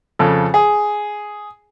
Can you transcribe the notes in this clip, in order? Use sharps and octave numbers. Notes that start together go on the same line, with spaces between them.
F2 C#3 A4
G#4